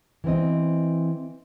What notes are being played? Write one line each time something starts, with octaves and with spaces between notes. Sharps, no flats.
E3 B3 C4 D#5